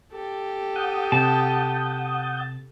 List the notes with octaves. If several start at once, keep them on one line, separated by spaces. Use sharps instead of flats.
G4 A4
F#5 D#6 G6
C3 A5